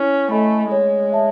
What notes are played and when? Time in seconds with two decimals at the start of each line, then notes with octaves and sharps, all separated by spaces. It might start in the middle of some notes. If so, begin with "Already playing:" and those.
Already playing: C#4 E4
0.31 A3 A4 D#5 G#5 B5
0.71 G#3 C#5
1.13 E5 A5